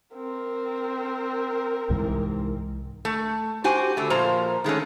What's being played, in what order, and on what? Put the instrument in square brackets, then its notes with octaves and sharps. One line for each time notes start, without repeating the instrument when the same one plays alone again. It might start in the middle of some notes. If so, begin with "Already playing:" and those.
[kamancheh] C4 A#4
[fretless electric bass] C2 G#2 E3
[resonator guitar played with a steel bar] A3
F#4 G4 C5 G#5
D3 A3
A#2 F3 C5 A#5
D#3 G#3 A3 C#4